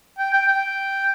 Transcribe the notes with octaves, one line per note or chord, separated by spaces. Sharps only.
G5
G5
G5